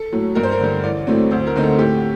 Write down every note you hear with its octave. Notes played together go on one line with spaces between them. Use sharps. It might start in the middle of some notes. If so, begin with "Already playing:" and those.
Already playing: A4
A2 F#3
G2 A#4
C5
A#4
D3 G3
A1 D5
A2 F#3 A3 C4
D2 C5
A#4
D3 A3 C4 D#4
A4
A2 G4